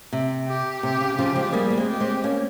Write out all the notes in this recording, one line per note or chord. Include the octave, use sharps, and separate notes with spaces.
C3
G4
C3 G4
C#3
C#3 F3 G4
F3 G#3
G3 A#3 G#4
A#3
G#3 C4
G4
G#3 C4
A#3 C#4